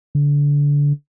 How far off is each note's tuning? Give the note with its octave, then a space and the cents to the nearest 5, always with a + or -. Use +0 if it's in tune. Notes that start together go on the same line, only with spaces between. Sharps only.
D3 -25